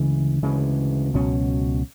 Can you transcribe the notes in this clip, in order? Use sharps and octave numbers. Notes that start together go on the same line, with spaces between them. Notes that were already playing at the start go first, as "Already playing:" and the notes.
Already playing: D2 C#3 E3 G#3
D2 C#3 E3 G#3
C#2 B2 F#3 C#4